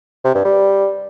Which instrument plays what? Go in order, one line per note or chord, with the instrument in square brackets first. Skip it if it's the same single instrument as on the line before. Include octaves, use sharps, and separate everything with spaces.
[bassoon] C3
G2
G3